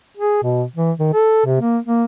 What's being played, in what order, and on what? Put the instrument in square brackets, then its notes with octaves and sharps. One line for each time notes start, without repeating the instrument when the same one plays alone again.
[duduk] G#4
B2
E3
D#3
A4
C3
A#3
A#3